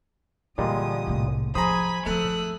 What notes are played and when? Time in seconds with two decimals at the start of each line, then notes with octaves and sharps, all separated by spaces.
0.58 A#2 D3 E3 G3 G#3 D#6
1.07 C2 A2
1.55 F3 G#4 C5 G#5 A#5 B5 D#6
2.06 F3 A3 C4 D#6 E6 F#6